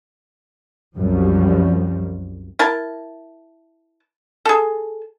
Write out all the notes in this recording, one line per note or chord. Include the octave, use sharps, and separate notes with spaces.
C2 F#2 F3 G3
E4 A#4 A5
G#4 A4